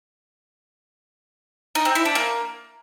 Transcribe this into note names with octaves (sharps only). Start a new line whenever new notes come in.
D#4
C4
E4
D4
A#3